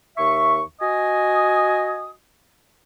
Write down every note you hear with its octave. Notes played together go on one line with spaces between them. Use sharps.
D#2 E5 C#6
F#4 D#5 G#5 D#6